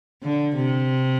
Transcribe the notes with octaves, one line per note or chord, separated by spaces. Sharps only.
D3
C3